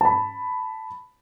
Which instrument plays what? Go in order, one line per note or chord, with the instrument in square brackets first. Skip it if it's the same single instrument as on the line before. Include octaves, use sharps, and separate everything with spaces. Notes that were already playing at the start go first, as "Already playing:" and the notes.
[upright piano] A5 B5